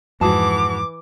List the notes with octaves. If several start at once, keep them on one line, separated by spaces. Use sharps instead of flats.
F2 G#2 E3 F#4 G#4 A5 D6